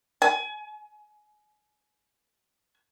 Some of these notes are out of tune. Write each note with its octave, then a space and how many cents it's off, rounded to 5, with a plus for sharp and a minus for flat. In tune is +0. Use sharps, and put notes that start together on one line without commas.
G#5 +25